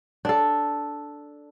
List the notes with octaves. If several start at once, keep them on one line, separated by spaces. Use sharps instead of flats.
D4 A4